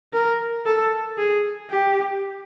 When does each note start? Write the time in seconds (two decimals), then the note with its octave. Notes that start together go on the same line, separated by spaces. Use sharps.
0.13 A#4
0.66 A4
1.17 G#4
1.71 G4